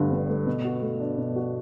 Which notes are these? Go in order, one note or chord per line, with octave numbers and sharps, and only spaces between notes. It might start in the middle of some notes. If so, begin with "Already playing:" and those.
Already playing: G1 G2 D3 A3
G1
A3
B2
F#4
A3
D4
B2
F#4